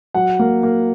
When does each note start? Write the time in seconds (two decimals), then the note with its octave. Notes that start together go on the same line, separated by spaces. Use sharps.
0.15 F#3 F#5
0.39 A#3
0.63 A#3